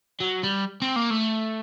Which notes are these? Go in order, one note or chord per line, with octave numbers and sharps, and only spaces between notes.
F#3
G3
C4
A#3
A3